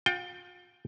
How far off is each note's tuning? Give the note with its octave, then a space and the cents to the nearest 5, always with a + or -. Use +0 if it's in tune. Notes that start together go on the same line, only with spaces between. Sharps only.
F4 +40 G5 +0